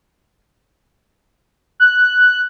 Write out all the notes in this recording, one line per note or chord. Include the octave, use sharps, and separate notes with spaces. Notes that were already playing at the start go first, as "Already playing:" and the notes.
F#6